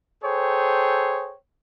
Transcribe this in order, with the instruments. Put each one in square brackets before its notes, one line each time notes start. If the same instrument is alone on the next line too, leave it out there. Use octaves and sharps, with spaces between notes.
[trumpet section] G#4 A4 C5 C#5 G5